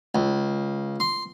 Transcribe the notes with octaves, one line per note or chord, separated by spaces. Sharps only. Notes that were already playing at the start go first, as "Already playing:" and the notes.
C#2
C6